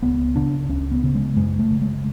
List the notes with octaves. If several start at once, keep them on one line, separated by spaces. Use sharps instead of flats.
C#2 B3
C#3 D4
C#2 C#4
B3
C#3
G#3
F#2 G#3
A3
C#3
G#3